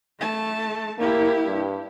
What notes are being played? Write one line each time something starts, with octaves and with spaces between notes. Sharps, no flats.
A3 A5
A#3 E4 G4
G2